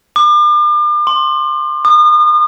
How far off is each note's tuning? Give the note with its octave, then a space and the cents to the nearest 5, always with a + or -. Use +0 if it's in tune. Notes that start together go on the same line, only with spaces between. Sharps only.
D6 +40
C6 +20
D#6 -40